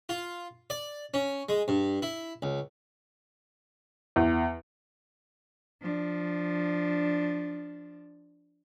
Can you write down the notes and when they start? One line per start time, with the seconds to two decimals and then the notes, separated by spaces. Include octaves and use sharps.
0.09 F4
0.70 D5
1.14 C#4
1.49 G#3
1.68 G2
2.02 E4
2.42 C#2
4.16 E2
5.81 F3 D4